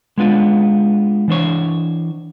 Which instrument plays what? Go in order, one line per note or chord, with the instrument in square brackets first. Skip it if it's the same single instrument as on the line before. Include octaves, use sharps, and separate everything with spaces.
[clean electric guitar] G#3 B3 D4 F4
E3 D4 C5 C#5